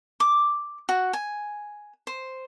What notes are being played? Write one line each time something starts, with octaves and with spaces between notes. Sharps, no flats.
D6
F#4
G#5
C5